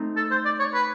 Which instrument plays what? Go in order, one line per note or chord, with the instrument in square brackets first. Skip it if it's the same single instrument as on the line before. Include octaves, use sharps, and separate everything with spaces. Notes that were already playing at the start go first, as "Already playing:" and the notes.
Already playing: [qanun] A3 C4 D#4
[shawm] A4
C5
D5
C#5
B4